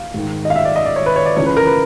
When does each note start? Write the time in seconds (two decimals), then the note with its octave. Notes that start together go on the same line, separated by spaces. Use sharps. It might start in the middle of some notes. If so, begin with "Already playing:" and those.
Already playing: F5
0.14 G#2 D#3
0.45 D#5
0.50 F5
0.56 E5
0.65 D5
0.76 D#5
0.85 D5
0.96 C#5
1.06 B4
1.16 C#5
1.26 D5
1.36 C#2 C#3 E3 C#5
1.46 B4
1.57 A#4
1.67 B4